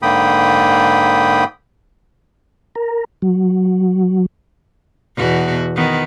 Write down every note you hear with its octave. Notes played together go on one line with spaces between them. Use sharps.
G#2 D3 A#3 G5 B5 D#6
A#4
F#3
E2 B2 F#4
D#3 B3